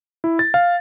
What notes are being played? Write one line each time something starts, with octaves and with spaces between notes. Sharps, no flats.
E4
A6
F5